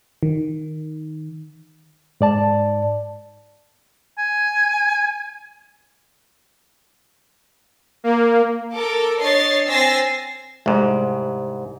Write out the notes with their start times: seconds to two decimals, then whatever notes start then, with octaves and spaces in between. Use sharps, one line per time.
0.23 D#3
2.21 G#2 D5 A5
4.18 G#5
8.04 A#3
8.75 A4 A#4 D6
9.21 D4 C#5 D#5 A6 C7
9.67 C4 G#5 E6 A6 A#6 C7
10.66 C2 G#2 G#3 A3